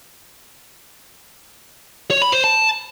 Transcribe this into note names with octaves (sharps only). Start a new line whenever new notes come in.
C#5
B5
C5
A5